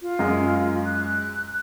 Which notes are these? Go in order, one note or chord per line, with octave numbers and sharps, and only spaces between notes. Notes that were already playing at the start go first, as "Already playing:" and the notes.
F4
F#2 G#3
F#6